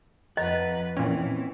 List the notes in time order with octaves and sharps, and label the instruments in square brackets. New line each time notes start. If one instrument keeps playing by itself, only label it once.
[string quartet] F2 B4 [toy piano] D#5 [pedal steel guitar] F#5 A#5 F#6
[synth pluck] A#2 C#4 [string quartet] E3 [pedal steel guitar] C4 C#5 G5